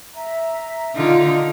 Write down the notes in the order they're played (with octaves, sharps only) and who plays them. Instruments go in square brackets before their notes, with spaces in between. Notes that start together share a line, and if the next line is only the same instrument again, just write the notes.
[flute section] E5 A#5
[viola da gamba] D3 D#4 F4